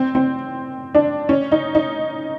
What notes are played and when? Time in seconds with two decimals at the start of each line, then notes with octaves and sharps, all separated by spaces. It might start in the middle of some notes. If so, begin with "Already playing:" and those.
Already playing: C4
0.15 C4
0.95 D4
1.29 C#4
1.52 D#4
1.75 D#4